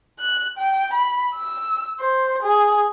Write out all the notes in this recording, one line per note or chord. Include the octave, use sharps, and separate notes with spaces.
F#6
G5
B5
E6
C5
G#4